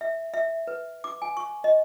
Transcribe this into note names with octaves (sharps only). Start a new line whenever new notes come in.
E5
E5
B4
D6
G#5
C#6
D#5